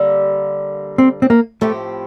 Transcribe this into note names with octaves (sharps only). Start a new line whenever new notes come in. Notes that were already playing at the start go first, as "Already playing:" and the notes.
Already playing: D3 G3 A#3
C4
C4
A#3
A2 F3 A3 C4 G4